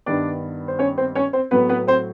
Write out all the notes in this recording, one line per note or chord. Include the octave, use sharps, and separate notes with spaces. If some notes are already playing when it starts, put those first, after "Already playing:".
G2 D#3 G3 B3 D4 D5
C5
C#4 C#5
C4 C5
C#4 C#5
C4 C5
A2 F#3 B3 B4
B3 B4
C4 C5